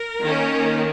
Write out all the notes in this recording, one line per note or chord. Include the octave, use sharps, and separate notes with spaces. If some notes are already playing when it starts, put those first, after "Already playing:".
Already playing: A#4
D#3 A#3 C#4